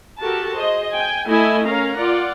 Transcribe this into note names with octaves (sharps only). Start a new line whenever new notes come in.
F#4 G4 A4 A#4 A5
G#4 C5 D#5
G5 G#5
A3 E4 A4 D#5 E5 G#5
C#4 A#4 F5 A#5
F4 D5 F#5